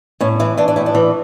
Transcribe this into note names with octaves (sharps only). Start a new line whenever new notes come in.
A2 C#4
E3 E4
E3 D4
D4
A2 E4
D4
E3